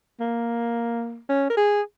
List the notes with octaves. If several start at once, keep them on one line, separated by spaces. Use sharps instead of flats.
A#3
C#4
A#4
G#4